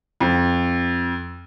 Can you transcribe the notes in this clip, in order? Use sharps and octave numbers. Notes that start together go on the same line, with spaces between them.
F2